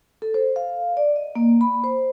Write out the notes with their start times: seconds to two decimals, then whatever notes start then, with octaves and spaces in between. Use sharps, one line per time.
0.22 A4
0.34 C5
0.56 F5
0.97 D5
1.16 D#5
1.35 A#3
1.61 B5
1.84 C5